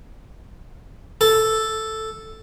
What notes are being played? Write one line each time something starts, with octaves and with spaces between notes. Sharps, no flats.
A4